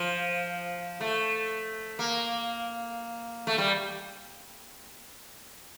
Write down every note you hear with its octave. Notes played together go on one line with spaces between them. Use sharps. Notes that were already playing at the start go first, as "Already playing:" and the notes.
Already playing: F3
A3
A#3
A3
G3